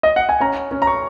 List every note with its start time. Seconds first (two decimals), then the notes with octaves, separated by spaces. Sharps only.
0.03 D#5
0.16 F#5
0.29 G#5
0.40 C#4 A#5
0.71 C#4
0.82 A#5
0.87 C#6